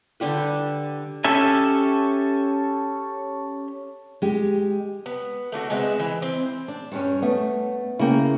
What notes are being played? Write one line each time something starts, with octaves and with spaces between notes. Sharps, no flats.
D3 G3 G4 B4
C#4 G4 A4 E5 G#5
G#3 G4
B3
A3 D4 F4 F#4
G#3 B3 C4 E5
E3
C4
D4
G2 G3 C#4
A3 B3
C#3 A#3 E4 G5